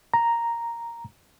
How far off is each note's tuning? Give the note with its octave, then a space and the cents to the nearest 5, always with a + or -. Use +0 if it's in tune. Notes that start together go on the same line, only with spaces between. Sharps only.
A#5 +0